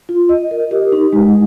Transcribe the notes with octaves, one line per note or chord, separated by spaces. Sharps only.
F4
D#5
A#4
G4
D#4
G#3